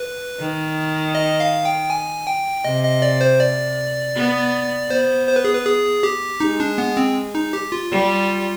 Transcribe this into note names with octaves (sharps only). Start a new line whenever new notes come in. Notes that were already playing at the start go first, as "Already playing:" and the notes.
Already playing: B4
D#3
D#5
F5
G5
G#5
G5
C3 D#5
D#5
D5
C5
D5
B3
B3 C5
C5
B4
G#4
B4
G#4
G4
G#3 D#4
D4
B3
C4
D#4
G4
F4
G3